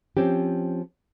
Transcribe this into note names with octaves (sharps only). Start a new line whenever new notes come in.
F3 C4 C#4 G4